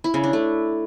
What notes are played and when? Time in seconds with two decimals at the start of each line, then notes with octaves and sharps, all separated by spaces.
0.04 E4
0.14 C#3
0.24 D4
0.33 A3